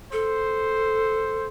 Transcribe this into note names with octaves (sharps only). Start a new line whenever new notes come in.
A4 C5